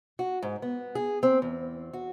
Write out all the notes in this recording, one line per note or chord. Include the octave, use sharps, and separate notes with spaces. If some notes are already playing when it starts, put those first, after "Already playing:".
F#4
G#2
B3
G#4
C4
E2
F#4